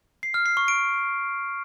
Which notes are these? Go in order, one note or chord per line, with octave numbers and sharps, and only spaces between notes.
C7
F6
C7
C#6
D7